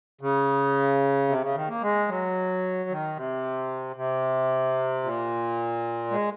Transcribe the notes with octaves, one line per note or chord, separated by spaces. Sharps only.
C#3
C3
C#3
D#3
A#3
G#3
F#3
D#3
C3
C3
A#2
G#3